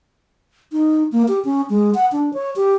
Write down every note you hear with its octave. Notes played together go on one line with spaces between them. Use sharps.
D#4
A#3
G4
C#4
G#3
F#5
D4
C#5
G4